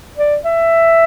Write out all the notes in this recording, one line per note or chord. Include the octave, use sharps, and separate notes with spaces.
D5
E5